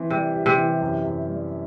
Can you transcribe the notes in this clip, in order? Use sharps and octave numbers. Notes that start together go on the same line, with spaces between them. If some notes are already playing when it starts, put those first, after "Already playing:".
Already playing: E3 C4
C3 G3
G4
C3
E3
F#2
F#2
G3